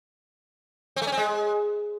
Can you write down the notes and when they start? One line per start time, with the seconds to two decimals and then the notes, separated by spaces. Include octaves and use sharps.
0.96 C4
1.02 A3
1.07 C#4
1.12 C4
1.17 G#3